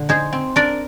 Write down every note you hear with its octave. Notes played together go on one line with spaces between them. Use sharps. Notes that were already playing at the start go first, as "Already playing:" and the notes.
Already playing: A#2 D3
D#4 G#4 C5
C4
D4 A#4 D5